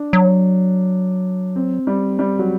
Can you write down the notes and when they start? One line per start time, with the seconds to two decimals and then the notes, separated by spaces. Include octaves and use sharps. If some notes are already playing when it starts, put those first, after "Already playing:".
Already playing: D4
0.13 F#3
1.56 C4
1.87 G3
2.19 G3
2.39 F#3